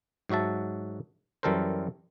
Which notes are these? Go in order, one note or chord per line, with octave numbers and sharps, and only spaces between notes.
G#2 F#3 F#4 E5 A5
F#2 E3 G3 A4 A#4 C5